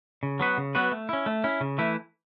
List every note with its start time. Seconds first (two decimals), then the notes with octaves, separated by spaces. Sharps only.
0.23 C#3
0.40 F#3 B3 F#4 B4
0.58 C#3
0.75 F#3 B3 F#4 B4
0.92 A3
1.09 C#4 E4
1.26 A3
1.44 C#4 E4
1.61 C#3
1.78 E3 A3 E4